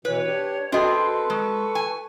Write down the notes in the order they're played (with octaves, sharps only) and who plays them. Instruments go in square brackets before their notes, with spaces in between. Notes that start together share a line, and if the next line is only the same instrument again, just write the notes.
[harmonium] B2 E3 [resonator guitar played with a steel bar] B4 [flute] C#5
[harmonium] D4 G4
[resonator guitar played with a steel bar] C4 G#4 [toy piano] D4 F#4 D#5 [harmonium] A4 B4 [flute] C6
[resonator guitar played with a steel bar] G#3 [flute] C#6
[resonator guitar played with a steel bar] G#5